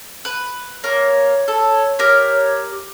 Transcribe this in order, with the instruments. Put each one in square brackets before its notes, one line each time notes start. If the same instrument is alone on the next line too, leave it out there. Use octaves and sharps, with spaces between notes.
[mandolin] B4
[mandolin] A#3 A#4 [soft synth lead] C#5
[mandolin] A4
G4 A#4 F6